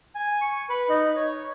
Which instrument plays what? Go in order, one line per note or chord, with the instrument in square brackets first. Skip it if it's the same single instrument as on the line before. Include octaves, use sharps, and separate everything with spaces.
[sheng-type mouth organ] G#5
C#6
B4
D#4
C#5